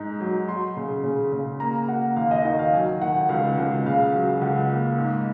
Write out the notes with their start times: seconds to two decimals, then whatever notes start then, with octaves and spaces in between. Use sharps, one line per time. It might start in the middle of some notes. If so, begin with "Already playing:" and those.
Already playing: G#2 D#4
0.20 F#3
0.48 F#3 C6
0.77 C#3
1.04 C#3
1.32 C#3
1.60 A#3 A#5
1.88 A#3 F#5
2.16 D#2 F5
2.31 D#5
2.45 D#3 D#5
2.59 F5
2.73 F#3 G#5
3.01 D#3 F#5
3.29 C#2 F5
3.58 C#2
3.85 C#3 F5
4.14 F#3
4.42 C#2 F#5
4.71 A#3
4.98 G#2